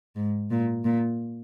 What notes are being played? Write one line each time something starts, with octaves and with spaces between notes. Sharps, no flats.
G#2
A#2
A#2